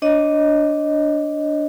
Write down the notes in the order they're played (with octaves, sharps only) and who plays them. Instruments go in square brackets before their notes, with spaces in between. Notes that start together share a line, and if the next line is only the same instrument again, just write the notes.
[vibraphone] D4 C#5 D#5